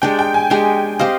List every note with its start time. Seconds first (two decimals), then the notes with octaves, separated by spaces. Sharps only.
0.02 G#3 D4 G4 G5
0.19 G5
0.34 G#5
0.50 G#3 D4 G4 G5
0.99 C4 G4 C5 D#5 F5